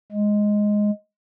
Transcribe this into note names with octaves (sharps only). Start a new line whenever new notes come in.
G#3